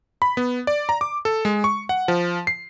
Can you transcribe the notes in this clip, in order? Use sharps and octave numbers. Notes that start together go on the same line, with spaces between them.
B5
B3
D5
A#5
D6
A4
G#3
C#6
F#5
F3
C7